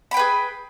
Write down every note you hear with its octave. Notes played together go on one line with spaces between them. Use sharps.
G#4 B4 G5 B5